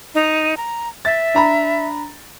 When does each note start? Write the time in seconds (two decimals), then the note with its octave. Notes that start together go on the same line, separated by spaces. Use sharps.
0.15 D#4
0.57 A#5
1.05 E5 A6
1.34 D4 A#5 B5